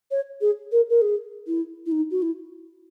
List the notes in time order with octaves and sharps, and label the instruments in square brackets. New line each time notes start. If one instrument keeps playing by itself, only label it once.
[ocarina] C#5
G#4
A#4
A#4
G#4
E4
E4
D#4
F#4
E4